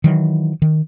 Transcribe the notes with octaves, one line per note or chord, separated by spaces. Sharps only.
D#3 E3 F#3
D#3